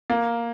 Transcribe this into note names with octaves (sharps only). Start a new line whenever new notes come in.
A#3